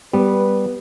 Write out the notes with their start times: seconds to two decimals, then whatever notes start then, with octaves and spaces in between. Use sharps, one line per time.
0.13 G3 B3 B4